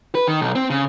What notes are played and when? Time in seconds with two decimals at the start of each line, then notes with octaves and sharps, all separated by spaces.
0.15 B4
0.27 D#3
0.41 B1
0.55 C4
0.70 C#3